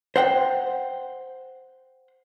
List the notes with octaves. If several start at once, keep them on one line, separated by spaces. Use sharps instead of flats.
C5 F#5 G5